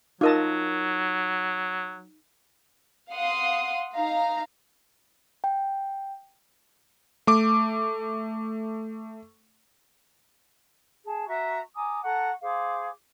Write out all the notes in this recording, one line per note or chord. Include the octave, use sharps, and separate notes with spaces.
F#3 D#4 F4 A#4 D#5 A5 D6
F5 F#5 C6 D#6
D#4 F5 A#5
G5
A3 D6
G#4 A5
F#4 E5 A#5 C#6
G#5 A#5 D6 D#6
A4 F#5 A#5 C#6
G#4 C5 F5 D6